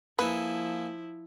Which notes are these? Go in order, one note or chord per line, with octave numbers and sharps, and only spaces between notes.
F3 A#3 E4 G#4 A4 B4